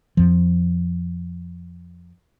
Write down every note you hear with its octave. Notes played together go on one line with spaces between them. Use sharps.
F2 F3